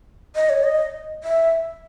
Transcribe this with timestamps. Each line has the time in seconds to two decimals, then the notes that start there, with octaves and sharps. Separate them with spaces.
0.35 D#5
0.50 C#5
0.64 D#5
1.24 E5